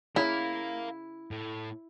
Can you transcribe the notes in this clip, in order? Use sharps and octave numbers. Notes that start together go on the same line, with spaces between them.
C#3 E4 A#4 F5
A2